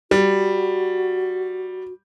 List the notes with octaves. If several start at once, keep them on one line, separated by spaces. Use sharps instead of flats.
G3 F#4